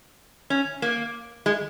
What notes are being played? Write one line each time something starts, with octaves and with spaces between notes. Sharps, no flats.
C#4
A#3
G#3